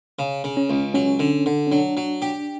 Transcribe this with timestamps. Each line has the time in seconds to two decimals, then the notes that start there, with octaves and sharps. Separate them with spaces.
0.19 C#3
0.44 C#3
0.57 C#4
0.70 C#2
0.94 F#3 C#4
1.19 D3
1.46 D3
1.67 C#4
1.71 F#3 D4
1.97 F#3
2.22 G4